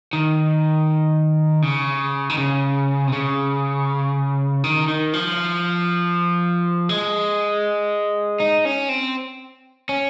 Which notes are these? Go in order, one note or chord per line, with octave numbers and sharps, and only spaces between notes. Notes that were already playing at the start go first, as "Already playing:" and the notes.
D#3
C#3
D#3
C#3
C3
C#3
D#3
D#3
F3
G#3
D#4
C#4
C4
C#4